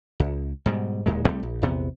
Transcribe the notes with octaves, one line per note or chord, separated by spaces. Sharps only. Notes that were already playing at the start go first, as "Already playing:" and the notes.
C#2
G#2 B2 G3
D1 D#2 A#2 G#3
C2 G3 A3 C4
A#1
A#1 E2 C3 B3